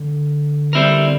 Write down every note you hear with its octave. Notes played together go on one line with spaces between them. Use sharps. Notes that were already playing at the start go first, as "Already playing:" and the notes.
Already playing: D3
G3 C4 E4 A#4